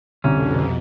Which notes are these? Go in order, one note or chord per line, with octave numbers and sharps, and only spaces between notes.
C2 F2 B2 D3 C#4